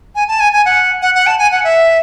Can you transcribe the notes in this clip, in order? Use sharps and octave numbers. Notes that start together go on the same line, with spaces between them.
G#5
A5
G#5
G#5
F#5
F#5
F#5
A5
G#5
F#5
E5